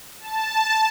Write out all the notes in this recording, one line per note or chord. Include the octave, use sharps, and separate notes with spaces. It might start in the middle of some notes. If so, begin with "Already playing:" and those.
A5